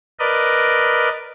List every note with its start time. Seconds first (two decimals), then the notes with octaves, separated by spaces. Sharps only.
0.19 A#4 B4 D5 D#5